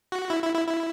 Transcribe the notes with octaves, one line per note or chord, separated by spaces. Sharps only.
F#4
E4
E4
E4
E4